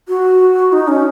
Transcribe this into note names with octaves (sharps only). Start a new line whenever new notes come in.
F#4
D#4
C#4